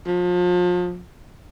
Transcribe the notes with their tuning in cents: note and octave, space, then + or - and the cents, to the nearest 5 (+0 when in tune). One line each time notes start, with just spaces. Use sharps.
F3 +35